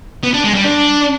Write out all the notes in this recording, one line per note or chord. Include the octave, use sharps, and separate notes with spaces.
B3
D4
G#3
G3
D4